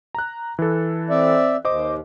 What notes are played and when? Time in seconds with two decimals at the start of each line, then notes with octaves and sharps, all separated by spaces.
0.15 A#5 F#6
0.59 E3 A4
1.10 C4 D5 E5
1.65 D#2 C5 D#5 D6